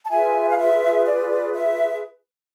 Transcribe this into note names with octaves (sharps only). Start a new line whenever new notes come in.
A5
F4 G#4 B4 E5 G#5
F5
E5
D5
E5